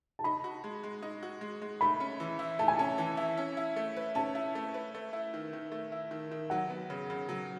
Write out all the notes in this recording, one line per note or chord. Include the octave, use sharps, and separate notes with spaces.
A5
D#4 B5
F#4
G#3
G#3
D#4
F#4
G#3
G#3
A3 B5
C#4
E3
E4
A3 A5
G#5
C#4 A5
E3
E4
C#4
E4
A3
B4
C#4 A5
E4
A3
B4
A3
E4
D#3
D#3
A3
E4
D#3
D#3
F#3 F#5
B3
C#3
C#3
F#3